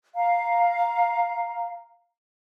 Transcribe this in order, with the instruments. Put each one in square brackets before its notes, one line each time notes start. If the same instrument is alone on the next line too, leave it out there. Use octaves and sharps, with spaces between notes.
[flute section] F5 A#5